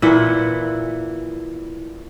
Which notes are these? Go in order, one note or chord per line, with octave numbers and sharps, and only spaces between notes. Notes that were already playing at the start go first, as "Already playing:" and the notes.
A#2 E3 E4 F#5